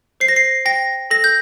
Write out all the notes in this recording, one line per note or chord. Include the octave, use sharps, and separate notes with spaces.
C5 C7
A#6
C7
G5 A#6
A4 A#6
G6